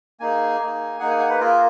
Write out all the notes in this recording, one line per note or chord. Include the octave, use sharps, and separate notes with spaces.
A#3 D#4 G#4 G#5
A#3 D#4 G#4
A#3 D#4 G#4 F#5
G#5
F#5
B4
A#3 F4 G#4 A#4